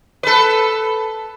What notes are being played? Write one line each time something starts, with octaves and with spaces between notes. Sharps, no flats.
A4 B4